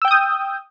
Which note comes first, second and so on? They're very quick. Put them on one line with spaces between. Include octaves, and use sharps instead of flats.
E6 G5 G6 D#6